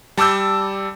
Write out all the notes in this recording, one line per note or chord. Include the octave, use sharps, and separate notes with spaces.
G3 A5 D6 E6 G6